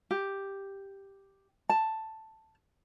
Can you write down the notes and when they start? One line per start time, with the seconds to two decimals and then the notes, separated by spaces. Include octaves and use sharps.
0.11 G4
1.69 A5